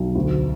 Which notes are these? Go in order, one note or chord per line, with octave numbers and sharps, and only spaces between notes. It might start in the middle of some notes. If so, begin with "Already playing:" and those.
Already playing: B1
D2